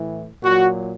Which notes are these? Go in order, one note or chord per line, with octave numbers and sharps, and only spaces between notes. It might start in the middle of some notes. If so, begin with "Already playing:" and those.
Already playing: A2 E3
A#2 F#3 F#4